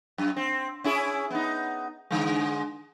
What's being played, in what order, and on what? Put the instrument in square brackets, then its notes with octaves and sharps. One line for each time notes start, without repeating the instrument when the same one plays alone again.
[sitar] F#2
C4
C#4 E4 G#4
B3 D#4
G#2 D3 G#3